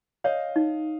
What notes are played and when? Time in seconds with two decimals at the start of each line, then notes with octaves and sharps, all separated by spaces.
0.24 C#5 D#5 F5
0.56 D#4